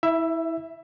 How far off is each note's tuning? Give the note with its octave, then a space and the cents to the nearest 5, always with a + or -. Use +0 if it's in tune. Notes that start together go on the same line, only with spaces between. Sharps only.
E4 -20 E5 +15